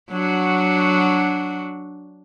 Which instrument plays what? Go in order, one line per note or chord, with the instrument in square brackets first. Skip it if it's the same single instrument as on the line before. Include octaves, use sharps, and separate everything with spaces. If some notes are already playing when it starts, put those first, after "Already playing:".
[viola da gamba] F#3 D4 F#4